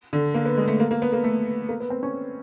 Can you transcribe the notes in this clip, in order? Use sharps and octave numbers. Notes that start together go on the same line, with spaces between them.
D3
A#3
B3
G#3
A3
A#3
A#3
B3
A#3
A3
A#3
B3
C4
C#4